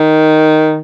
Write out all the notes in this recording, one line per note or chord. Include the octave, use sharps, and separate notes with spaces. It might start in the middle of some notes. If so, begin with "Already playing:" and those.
Already playing: D#3